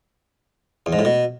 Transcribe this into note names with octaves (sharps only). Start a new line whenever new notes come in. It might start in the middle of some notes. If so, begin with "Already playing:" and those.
E2
G#2
A2
B2